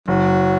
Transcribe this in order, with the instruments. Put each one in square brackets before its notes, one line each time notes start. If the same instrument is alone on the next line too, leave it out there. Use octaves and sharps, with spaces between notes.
[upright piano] F#1 [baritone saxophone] F#3